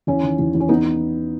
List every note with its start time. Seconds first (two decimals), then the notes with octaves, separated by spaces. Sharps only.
0.07 E2 C#4 E4
0.23 D#3
0.39 E2
0.55 E2
0.60 C#4
0.69 B3 D#4